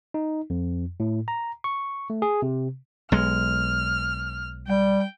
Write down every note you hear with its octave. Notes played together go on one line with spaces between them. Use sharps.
D#4
F2
A2
A#5
C#6
A3
G#4
C3
B1 G#3 F6
G3 G5